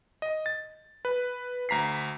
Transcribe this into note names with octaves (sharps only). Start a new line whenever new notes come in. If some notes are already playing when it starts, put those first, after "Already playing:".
D#5
A6
B4
D2 A#5 B6 C7